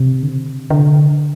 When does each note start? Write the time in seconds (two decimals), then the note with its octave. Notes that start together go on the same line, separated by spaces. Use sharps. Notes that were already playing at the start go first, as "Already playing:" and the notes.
Already playing: C3
0.23 D3
0.29 C3
0.70 D3